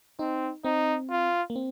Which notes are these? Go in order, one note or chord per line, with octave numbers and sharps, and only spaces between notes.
C4 D#4
C4 D#4
F4
A#3
C4